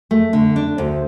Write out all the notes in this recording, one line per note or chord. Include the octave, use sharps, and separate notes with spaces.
A3
D3
D4
D2 C5